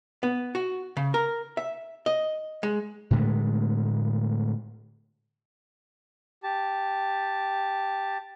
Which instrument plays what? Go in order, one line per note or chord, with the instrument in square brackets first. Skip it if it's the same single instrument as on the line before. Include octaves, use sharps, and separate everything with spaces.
[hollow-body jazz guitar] B3
F#4
C#3
A#4
E5
D#5
G#3
[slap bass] A2 D3 G#3 A3
[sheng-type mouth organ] G4 A5